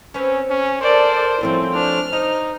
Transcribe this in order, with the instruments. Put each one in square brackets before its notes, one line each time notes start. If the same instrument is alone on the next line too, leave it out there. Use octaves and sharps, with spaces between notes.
[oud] C4 B4 C#5 [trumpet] C#4
[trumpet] C#4
[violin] A4 D5 [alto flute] A#4 [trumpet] C5
[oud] F3 A3 C#4 [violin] C4 [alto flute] E4
[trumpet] D4 [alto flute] C5 [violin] F6
[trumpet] D#4 [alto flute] C5 [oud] D#5